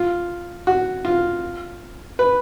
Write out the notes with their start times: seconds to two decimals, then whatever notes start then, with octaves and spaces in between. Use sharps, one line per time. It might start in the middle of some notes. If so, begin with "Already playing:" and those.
Already playing: F4
0.67 F#4
1.05 F4
2.19 B4